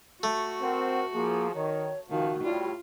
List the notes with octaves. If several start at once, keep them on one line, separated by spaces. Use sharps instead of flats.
A3 F#4
C4 A#4 F#5
F3 A#3 G#4
D#3 C#5
C#2 C3 D#3 F3 F#4
A2 G3 F4